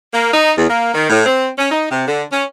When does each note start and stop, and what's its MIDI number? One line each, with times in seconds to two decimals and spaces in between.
0.14 0.28 58
0.32 0.51 63
0.57 0.67 40
0.69 0.92 58
0.94 1.09 51
1.09 1.24 45
1.25 1.48 60
1.57 1.67 61
1.71 1.86 63
1.90 2.06 48
2.06 2.23 50
2.31 2.44 61